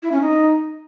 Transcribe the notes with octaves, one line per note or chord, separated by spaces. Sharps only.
E4
C#4
D#4